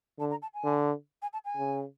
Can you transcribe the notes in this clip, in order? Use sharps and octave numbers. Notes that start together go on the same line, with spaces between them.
D3 A5
A#5
A5
G#5
D3
G#5
A5
G#5
C#3